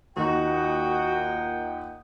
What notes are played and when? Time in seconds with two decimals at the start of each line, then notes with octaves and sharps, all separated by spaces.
0.17 D#2 A#2 D#4 F#4 D#5 F#5 G5